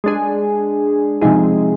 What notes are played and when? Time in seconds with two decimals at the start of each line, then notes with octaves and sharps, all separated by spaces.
0.04 G#3 D4 G#4
1.22 C3 F3 G#3 D#4 G#4